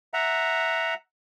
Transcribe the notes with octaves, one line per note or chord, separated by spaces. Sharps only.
E5 F#5 A#5